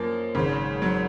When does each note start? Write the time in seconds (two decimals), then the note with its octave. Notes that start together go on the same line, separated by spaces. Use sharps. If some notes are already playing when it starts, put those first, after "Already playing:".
Already playing: F#2 F3 A#3
0.35 G#1 G#2 C#3
0.82 F#3